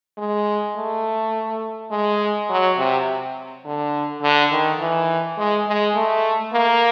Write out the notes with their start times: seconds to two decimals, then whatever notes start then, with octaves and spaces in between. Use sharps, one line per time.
0.18 G#3
0.75 A3
1.91 G#3
2.50 F#3
2.77 C3
3.65 D3
4.22 D3
4.51 D#3
4.79 E3
5.37 G#3
5.67 G#3
5.95 A3
6.53 A#3